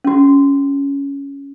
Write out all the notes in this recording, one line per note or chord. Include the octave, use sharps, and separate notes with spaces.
C#4 F#4